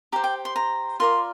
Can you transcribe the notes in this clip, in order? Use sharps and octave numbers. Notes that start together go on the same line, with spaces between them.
G4 C5 A#5
G5
C6
A#5
F4 A#4 D5 C6